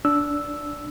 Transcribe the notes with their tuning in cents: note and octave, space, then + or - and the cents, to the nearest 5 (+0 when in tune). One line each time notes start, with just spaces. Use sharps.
D4 -15 E6 +0